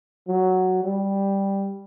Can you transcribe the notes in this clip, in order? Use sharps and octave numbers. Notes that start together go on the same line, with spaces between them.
F#3
G3